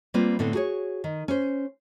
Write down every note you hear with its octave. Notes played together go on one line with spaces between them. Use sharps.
G3 A#3 C4 F4 B4
A2 D3 B3 C4 E4
F#4 G#4 C#5
D#3
C#4 C5